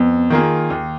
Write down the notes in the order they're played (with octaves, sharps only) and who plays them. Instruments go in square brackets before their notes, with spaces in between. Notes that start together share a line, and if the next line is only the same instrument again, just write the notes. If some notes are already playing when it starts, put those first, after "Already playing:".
Already playing: [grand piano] F2 [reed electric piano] B3
[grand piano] D#3 A#3 F4 G#4
D#2